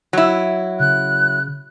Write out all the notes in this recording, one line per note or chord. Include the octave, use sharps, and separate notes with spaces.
F#3 E4
C#3 F#6